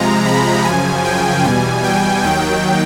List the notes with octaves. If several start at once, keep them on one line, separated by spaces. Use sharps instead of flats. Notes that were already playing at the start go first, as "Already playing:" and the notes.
Already playing: C3 F3 G#3 A#5
B5
F#2 C#3 F3 G#5
G5
E2 B2 G3 G#5
G5
D#2 D#3 F#3 G5